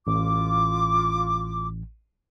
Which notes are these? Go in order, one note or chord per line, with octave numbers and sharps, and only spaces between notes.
A1 F4 D6